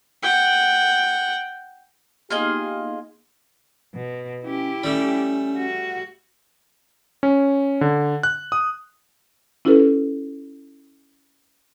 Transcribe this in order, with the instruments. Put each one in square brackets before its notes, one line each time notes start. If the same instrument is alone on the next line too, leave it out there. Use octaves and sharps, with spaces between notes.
[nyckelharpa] F#5 G5
[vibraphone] A#3 B3 D#4 [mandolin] F4 G#4 D#5 [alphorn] G4
[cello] B2
[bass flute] C#4 [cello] E4 G4
[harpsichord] G3 A3 [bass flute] C#4
[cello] F#4
[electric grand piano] C#4
D3
F#6
D#6
[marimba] C#4 E4 F4 G4 A4 B4